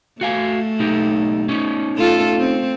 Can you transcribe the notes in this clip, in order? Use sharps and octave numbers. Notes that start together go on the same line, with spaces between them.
A3 F#4 F5 G#5
B1 D#4 G4
C#4 D#4
A3 F4 A4
C4